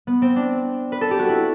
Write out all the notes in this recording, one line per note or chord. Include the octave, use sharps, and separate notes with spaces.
B3
C4
D4
B4
A4
G4
F#4
E4